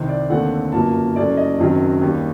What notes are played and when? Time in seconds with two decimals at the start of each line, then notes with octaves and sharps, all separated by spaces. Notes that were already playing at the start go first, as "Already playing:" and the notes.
Already playing: C2 C3 D#3 C5
0.09 D5
0.30 D#2 D3 A3 C4 F#5
0.72 G1 F#2 F#3 A#3 A5
1.16 F#1 F#2 F#3 A3 D5
1.37 D#5
1.58 F#1 F#2 D#3 F#3 C4
2.01 D#2 D#3 G3